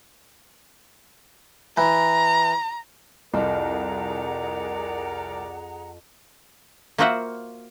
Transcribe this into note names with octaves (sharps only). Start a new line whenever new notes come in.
E3 A#5
C2 F2 G#4 A#4 D5 F#5 A#5
A#3 F4 F#4 C5 E5 F#5